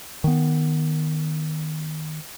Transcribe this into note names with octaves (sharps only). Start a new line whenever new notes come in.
D#3 B3